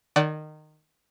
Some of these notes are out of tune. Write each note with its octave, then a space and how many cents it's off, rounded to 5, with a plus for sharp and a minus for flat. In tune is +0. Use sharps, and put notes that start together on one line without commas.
D#3 -20 D5 -5 F#5 +40